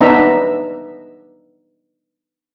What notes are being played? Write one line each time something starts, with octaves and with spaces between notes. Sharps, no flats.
B3 D4 D#4 E5 A#5